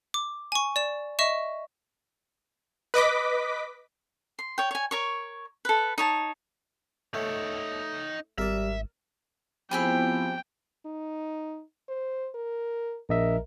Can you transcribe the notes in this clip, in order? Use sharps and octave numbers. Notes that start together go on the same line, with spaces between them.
D6
G#5 C#6
D5 E7
D#5 E5 C#6 E7
B4 D#5 D6 B6
C6
C#5 G5
C#5 G#5
A#4 C#5 C#6
A4 B4
D#4 C#5 A5
A3 D#4 C#5
G#1 G3 A#4 D5 E5
F3 B3 C4 E4 G4 G#4 G5 B5
D#4
C5
A#4
A#1 A#4 D#5 E5